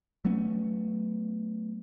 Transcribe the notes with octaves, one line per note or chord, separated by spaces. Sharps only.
F#3 A3 B3 C#4